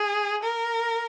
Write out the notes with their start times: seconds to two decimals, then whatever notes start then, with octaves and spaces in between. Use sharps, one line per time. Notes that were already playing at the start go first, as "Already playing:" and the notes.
Already playing: G#4
0.43 A#4